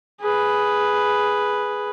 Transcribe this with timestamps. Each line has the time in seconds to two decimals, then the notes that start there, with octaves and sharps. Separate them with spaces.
0.21 G#4 B4